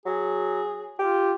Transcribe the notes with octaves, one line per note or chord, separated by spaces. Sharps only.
F#3 G#4
F4 G4